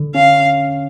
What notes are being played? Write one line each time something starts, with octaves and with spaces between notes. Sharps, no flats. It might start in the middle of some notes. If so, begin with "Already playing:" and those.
Already playing: D3
C#4 F5